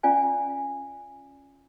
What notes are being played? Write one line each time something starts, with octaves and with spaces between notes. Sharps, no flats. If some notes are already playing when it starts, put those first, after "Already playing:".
C#4 F4 D5 F5 G#5